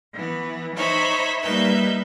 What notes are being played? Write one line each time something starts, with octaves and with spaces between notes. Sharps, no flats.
E3 B3
D#4 C5 C#5 E5 B5
G3 A#3 D#4 B4 E5 G6